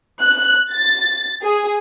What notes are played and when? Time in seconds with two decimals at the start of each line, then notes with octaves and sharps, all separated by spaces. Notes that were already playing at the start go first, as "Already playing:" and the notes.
0.22 F#6
0.72 A6
1.43 G#4